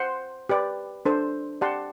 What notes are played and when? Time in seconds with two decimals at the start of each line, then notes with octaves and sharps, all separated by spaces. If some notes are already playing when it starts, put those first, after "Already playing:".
Already playing: C5 F#5 C6
0.49 G4 B4 D5
1.05 D4 A4 C5
1.61 G4 D5 F#5 A5 C6